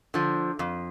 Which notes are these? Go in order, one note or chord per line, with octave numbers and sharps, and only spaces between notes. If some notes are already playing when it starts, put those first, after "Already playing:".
D3 F3
F2